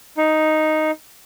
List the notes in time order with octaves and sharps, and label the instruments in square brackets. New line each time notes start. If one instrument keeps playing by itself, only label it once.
[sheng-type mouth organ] D#4